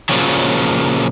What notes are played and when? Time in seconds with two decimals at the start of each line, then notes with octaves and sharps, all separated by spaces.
0.09 A#2 C#3 F3 F#3